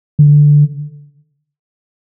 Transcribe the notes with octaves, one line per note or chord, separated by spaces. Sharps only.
D3